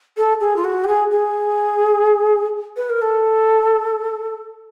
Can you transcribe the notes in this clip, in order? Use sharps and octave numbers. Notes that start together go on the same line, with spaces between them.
A4
G#4
F4
F#4
G4
G#4
G#4
B4
A#4
A4